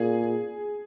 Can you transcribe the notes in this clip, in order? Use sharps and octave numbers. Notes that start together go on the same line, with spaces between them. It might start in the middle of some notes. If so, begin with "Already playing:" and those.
Already playing: A#2 G#4